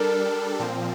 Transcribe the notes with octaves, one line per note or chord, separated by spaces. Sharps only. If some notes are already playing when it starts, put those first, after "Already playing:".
Already playing: G3 D4 A4 A#4
A#2 F3 C4